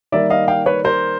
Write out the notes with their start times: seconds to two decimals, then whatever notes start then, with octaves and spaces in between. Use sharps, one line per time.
0.12 D#3 G3 A#3 D5 E5
0.30 D#5 F5
0.48 F5 G5
0.66 B4 C#5
0.85 A#4 C5